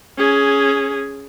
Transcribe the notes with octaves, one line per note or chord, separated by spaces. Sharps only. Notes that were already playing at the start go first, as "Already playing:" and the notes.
C#4 G#4